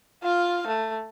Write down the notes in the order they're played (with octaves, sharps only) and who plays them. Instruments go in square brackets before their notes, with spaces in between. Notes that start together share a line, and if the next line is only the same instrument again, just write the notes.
[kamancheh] F4 F5
A3